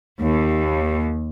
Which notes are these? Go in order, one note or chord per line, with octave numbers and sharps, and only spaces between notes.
D#2